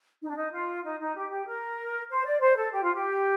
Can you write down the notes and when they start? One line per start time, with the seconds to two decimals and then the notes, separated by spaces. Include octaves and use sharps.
0.21 D#4
0.29 D4
0.36 D#4
0.52 F4
0.84 D#4
1.00 D#4
1.16 G4
1.31 G4
1.47 A#4
2.09 C5
2.25 D5
2.40 C5
2.56 A4
2.72 G4
2.83 F4
2.94 G4